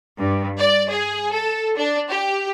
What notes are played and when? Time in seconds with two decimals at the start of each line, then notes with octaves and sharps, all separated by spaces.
0.18 G2
0.58 D5
0.89 G#4
1.33 A4
1.77 D4
2.10 G4